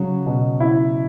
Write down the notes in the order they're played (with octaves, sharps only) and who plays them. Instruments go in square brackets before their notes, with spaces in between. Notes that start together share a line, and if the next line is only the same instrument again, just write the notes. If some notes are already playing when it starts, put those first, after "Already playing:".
Already playing: [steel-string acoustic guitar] C#3 F#3
[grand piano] B2
E4